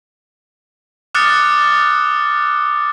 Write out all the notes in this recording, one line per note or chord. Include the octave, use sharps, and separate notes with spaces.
D6 D#6 F6 F#6 A6 C#7